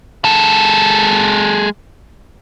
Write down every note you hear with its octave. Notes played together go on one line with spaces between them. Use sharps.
G#3 A4